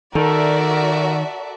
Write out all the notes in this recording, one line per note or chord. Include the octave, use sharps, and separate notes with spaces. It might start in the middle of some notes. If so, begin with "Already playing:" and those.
D#3 F#4 A4 A#4 D5 E5